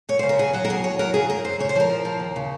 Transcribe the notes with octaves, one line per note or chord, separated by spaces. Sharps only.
F#2 C#5
C5
C#3
A#4
F#3 G#4
F#3 F#4
A#4
D#2 G#4
D#2 C#5
F#3 A#4
C#3 G#4
F#2 A#4
F#2 C5
C#3 C#5
C5
F3 A#4
F3
F3
D#2
C#3